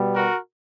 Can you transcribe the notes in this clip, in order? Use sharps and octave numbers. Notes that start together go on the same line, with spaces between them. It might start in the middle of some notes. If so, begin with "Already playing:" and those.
Already playing: B2 G3 B3
F#4 A#4